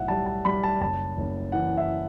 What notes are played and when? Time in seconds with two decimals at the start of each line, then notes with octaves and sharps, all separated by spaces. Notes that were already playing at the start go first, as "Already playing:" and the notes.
Already playing: B1 A2 E5 F#5
0.08 G3 A5
0.26 A5
0.45 G3 B5
0.64 A5
0.80 F#1 A5
1.17 F#1
1.52 E3 F#5
1.77 E5